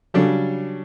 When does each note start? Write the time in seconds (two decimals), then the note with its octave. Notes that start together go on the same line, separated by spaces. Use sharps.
0.14 C#3 F#3 G3 D4 A4